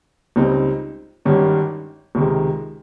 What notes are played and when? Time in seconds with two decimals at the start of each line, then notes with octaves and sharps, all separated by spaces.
0.36 C#2 C#3 G3 C4 D#4
1.25 G#1 G2 D#3 G3 C#4
2.15 C#2 C3 D#3 G#3